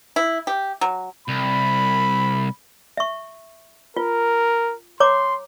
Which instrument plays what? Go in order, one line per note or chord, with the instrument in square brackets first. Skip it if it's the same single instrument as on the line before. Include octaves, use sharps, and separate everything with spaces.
[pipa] E4
G4
F#3
[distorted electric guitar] C2 [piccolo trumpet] B5
[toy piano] E5 C#6
[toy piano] F4 [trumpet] A#4
[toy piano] C#5 A#5 D6 [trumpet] C6